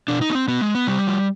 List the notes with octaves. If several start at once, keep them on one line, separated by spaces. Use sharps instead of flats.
B2 D4
D#4
B3
C4
B2 B3
G#3
B3
C3 G3
F3